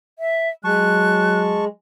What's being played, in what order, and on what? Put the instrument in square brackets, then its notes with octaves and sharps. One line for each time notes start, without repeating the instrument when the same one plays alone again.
[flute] E5
[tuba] F#3 [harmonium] G#3 [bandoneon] A5 C#6 [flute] F#6